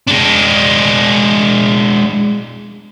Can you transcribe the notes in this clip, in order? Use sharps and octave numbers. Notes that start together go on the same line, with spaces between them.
G#3 D4